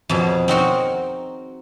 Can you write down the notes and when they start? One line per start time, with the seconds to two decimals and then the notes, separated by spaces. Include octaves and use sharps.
0.09 F2 B2 G#4
0.48 C4 D#4 F#4 A#4